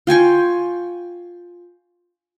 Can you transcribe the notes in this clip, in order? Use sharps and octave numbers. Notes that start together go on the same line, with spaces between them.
F4 G5 G#5 C#6